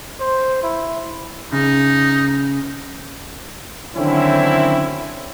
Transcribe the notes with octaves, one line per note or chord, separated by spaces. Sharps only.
C5
E4
C#3 D#4
D3 D#3 F#3 C4 C#4 E4